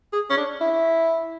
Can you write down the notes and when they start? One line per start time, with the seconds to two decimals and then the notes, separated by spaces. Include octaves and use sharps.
0.13 G#4
0.30 C#4
0.37 D4
0.61 E4